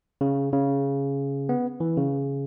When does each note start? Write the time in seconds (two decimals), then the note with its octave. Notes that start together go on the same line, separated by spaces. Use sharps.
0.21 C#3
0.52 C#3
1.49 B3
1.80 E3
1.97 C#3